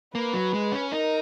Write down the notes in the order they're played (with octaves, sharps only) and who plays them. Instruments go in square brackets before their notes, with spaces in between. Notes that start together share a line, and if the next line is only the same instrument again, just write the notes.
[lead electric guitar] A#3 [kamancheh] B4
[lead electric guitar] F#3
G#3
C#4
[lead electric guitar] D#4 [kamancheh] A#4